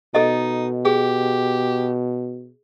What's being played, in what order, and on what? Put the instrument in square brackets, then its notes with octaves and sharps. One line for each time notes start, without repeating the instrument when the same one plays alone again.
[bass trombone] B2 [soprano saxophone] D#4 [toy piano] A4 D#5
[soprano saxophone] G4 [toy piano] G#4